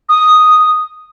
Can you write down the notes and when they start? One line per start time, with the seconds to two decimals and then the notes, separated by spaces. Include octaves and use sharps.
0.09 D#6